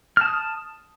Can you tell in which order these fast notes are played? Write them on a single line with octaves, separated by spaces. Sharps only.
F6 A5 D#6